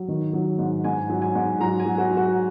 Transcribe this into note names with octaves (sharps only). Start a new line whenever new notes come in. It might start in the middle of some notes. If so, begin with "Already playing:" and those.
Already playing: F#3
D#3
F#3
G#2
G#2 G#5
F#3
G#5
G#2
F#3 A#5
G#5
F#3
F#4
F#3
F#4